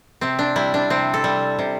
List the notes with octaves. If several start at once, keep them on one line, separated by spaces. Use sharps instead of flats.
C3 C4
D4
G3 E4
D4
C3 C4
A4
G3
C3